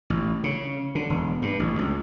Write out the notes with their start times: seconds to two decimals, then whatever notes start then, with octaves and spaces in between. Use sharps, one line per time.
0.10 A1
0.44 C#3
0.95 D3
1.10 E1
1.42 G2
1.59 A1
1.79 C#2